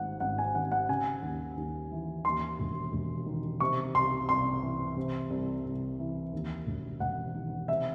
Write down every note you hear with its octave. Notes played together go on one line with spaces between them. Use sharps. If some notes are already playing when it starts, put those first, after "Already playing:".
Already playing: G#1 G#2 F#5
G#1 F#5
G#5
D#3 F#5
F#5
C#3 G#5
D#2
D#2
E3
D#2 C6
E1
E1
D#3
C3 C#6
C2 C6
C2 C6
E3
C3
C2
C2
E3
D#2
E1
E1 F#5
D#3
C3 E5